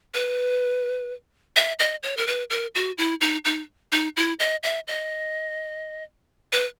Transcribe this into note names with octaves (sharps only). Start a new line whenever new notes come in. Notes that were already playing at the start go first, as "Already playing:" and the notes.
B4
E5
D#5
C#5
A#4
B4
A#4
F#4
E4
D#4
D#4
D#4
E4
D#5
E5
D#5
B4